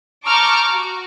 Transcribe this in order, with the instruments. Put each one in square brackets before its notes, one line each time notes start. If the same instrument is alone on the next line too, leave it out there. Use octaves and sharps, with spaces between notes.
[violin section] A5 A#5 C#6 D6 F6 G6
F#4